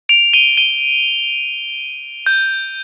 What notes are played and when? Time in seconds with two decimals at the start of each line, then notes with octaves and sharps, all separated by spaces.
0.09 D7 F7
0.34 D#7 G7
0.57 D#7 G7
2.26 G6